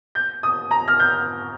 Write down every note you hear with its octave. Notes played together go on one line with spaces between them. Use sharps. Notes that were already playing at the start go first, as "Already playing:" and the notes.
G6
D#6
A#5
F6
G6